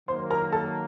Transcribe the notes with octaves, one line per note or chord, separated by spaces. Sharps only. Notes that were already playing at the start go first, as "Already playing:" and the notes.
D#3 F#3 A#3 C5 C6
A#4 A#5
A4 A5